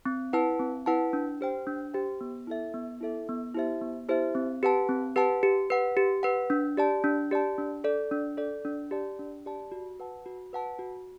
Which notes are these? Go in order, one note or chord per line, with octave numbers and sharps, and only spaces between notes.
C4
E4 B4 F#5 A5
C4
E4 B4 F#5 A5
D4
G4 C5 G5
D4
G4 C5 G5
B3
E4 A4 E5
B3
E4 A4 E5
B3
E4 G4 C5 E5
B3
E4 G4 C5 E5
C4
G4 B4 F#5 A5
C4
G4 B4 F#5 A5
G4
B4 F#5
G4
B4 F#5
D4
G4 D5 A5
D4
G4 D5 A5
D4
A4 D5
D4
A4 D5
D4
G4 D5 A5
D4
G4 D5 A5
F#4
B4 F#5 A5
F#4
B4 F#5 A5
F#4